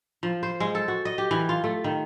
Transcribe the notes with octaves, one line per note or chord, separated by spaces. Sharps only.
F3
C5
G#3
A4
F#4
D#5
G4
E3
F4
A3
D#3